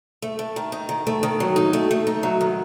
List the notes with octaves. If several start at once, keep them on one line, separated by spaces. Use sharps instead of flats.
A3
A3
D#3
D#4
D#3
A3
D#3
F#3
D#4
A3
A3
D#4
F#3
D#3